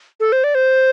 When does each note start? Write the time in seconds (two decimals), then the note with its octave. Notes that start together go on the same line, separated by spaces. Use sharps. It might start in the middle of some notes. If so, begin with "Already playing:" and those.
0.20 A4
0.32 C5
0.44 D5
0.55 C5